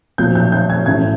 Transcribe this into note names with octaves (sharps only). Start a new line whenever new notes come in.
B1 A#2 F3 G6
G6
G6
G#6
A1 A2 E3 G#6